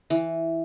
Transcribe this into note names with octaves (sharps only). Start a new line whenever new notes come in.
E3